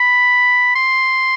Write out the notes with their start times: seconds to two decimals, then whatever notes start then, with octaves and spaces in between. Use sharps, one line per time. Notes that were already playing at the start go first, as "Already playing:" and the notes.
Already playing: B5
0.75 C6